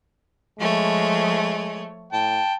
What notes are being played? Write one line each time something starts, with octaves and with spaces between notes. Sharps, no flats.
F3 G#3 A3 C#5
A2 G5 A5